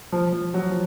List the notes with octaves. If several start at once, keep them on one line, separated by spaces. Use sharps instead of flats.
F3
F3
F#3
F3